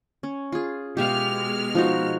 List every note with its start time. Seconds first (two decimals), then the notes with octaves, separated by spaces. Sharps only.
0.23 C#4
0.52 F4 G#4
0.97 B2 G#3 G4 E5 F5 F6
1.75 F3 D#4 F#4